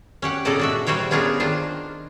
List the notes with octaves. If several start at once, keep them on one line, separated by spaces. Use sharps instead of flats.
C#4 G4 F#5
A#2 C#3 A4 D5 D#5 A5
D4 F#4 E5
G3 F#4 C5 C#5 G5
B3 C#4 D4 F4 G#4 A#4
D#3 D4 F4 C5